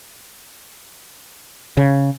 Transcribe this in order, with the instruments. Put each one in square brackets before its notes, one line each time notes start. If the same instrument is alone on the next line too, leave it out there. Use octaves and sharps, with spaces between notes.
[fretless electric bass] C#3